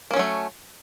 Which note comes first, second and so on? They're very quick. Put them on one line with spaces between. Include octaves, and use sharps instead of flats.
A#3 C#4 F#3 A3